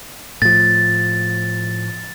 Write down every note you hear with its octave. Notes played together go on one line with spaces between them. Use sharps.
A2 F3 A6